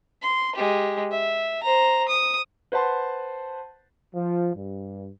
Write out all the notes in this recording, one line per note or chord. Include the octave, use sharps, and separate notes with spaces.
C6
G#3 G4
E5
C5 A#5
D#6
B4 C5 F#5 A5 C6
F3
G2